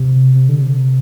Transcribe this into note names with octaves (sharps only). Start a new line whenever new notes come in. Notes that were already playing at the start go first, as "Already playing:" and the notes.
Already playing: C3
C3
D3
C3